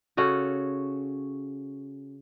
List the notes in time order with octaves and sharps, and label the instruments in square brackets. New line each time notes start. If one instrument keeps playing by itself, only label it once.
[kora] C#3 C#4 F#4 A4